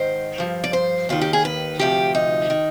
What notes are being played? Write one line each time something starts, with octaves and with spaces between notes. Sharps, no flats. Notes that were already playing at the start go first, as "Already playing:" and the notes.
Already playing: G#2 D#3 C5
G2 F3
D5
C5
D#2 D#3 F4
G4
G#4
B4
D2 C3 F3 G4
D#4
D#3